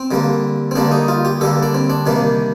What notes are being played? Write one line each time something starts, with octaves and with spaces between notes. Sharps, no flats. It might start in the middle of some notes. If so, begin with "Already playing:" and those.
Already playing: C4
D3 G3 A#3
C4
D3 G3 A#3 D4
D#4
F4
G4
D3 G3 A#3 A4
D4
C4
D4
C3 D#3 G3 A#3